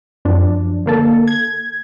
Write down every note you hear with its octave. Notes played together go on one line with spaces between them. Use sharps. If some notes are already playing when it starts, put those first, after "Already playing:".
F#2 F3 D4
D3 A#3 A4
G#6